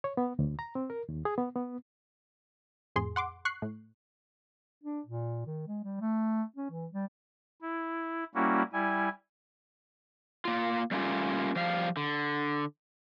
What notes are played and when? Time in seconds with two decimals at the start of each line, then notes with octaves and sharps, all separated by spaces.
0.04 C#5
0.17 B3
0.39 D2
0.59 A#5
0.75 C4
0.90 A#4
1.09 D#2
1.25 G#4
1.38 B3
1.55 B3
2.96 F2 A2 G#4 C6
3.16 F#5 C6 D6
3.45 C#6 F#6 C7
3.62 A2
4.84 D4
5.06 A#2
5.47 D#3
5.68 G#3
5.84 G3
6.01 A3
6.56 C#4
6.70 E3
6.93 G3
7.62 E4
8.35 G3 A#3 C#4 E4 F#4
8.73 G3 E4 G#5
10.45 A#3 F4
10.91 G3 A3 A#3 C#4 F4 G4
11.56 F3 G3 F5
11.97 D3